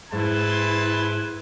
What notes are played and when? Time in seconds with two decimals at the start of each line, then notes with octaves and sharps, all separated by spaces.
0.12 G#2 E4 B4 A5 C6 G#6